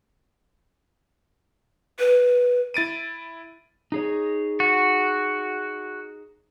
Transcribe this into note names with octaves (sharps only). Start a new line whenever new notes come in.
B4
E4 A6 D7 D#7
D#4 G#4 C#5
F#4